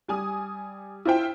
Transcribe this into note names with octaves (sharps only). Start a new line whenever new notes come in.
G3 G#5 D#6
E4 F4 C5 G5